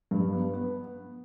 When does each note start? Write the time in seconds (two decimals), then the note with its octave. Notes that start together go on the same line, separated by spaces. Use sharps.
0.11 G2
0.33 B3
0.54 B3